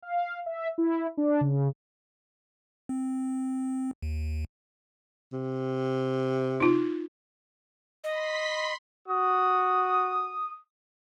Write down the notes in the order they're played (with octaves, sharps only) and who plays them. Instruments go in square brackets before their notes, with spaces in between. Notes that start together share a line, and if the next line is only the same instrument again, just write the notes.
[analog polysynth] F5
E5
E4
D4
C#3
[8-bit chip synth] C4
D#2
[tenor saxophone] C3
[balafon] D#4 F4
[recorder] D#5 [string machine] B5 C6 B6
[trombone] F#4 [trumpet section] D#6